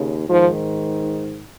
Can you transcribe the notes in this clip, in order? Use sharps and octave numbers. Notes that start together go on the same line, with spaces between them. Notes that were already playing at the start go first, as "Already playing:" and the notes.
Already playing: D#2 C#3
G#2 D#3 F3